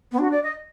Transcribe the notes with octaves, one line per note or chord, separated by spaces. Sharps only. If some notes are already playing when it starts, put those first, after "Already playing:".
B3
D4 F#4
D5
D#5